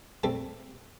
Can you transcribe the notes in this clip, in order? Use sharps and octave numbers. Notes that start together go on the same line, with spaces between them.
G3 A3 C4 A4